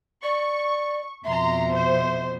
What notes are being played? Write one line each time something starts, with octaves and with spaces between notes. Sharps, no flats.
D5 C#6
F2 B2 E5 A#5 C6
C5